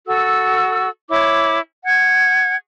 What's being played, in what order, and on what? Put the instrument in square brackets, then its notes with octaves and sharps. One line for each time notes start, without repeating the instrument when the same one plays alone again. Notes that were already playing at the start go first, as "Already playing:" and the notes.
[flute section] F#4 A4 E6
E4 C#5 D6
F#5 G#6